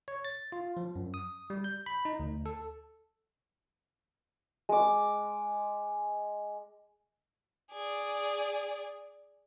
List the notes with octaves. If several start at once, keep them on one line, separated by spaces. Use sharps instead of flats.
C#5
A6
F4
F3
F#2
D#6
G3
G6
B5
D#4
D2
A4
G#3 D6
G#4 D5